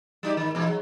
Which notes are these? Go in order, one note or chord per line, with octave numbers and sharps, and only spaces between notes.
G3 D#4 G4
G#2 D#3
E2 B2 G#3
F#3